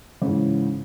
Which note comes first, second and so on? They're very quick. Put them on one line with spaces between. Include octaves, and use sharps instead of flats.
C#3 G#2 E3